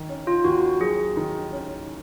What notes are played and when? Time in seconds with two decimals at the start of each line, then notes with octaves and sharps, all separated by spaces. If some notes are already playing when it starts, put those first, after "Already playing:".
Already playing: D#3
0.09 C#4
0.27 F4
0.44 D#2 F#4
0.80 F#3 G#4
1.17 D#3
1.52 C#4